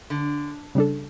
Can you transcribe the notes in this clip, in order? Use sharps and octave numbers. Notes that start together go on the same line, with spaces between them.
D3
C#3 G3 D4 A4